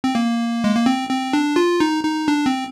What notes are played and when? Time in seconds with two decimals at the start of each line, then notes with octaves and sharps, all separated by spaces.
0.04 C4
0.15 A#3
0.64 G#3
0.75 A#3
0.86 C4
1.09 C4
1.33 D4
1.56 F4
1.80 D#4
2.04 D#4
2.28 D4
2.46 C4